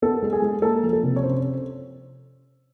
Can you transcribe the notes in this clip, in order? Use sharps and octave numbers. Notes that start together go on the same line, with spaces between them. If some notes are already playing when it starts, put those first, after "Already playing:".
B3 A4
G#3
G#4
G#3
A#3 A4
F3
A4
C3
C#5
C#4 C5